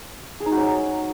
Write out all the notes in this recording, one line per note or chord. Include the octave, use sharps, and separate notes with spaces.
G#4
D#4
F#4
C#4
F#3